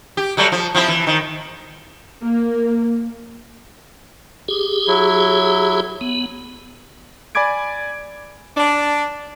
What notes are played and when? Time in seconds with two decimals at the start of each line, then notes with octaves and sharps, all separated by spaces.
0.17 G4
0.37 F#3 G3 A3
0.52 F3
0.75 F3 C4 E4
0.88 E3
1.07 D#3
2.21 A#3
4.48 G4 G#4
4.88 F#3 E4
6.01 B3
7.35 D5 G#5 B5 D6 G#6 D7
8.57 D4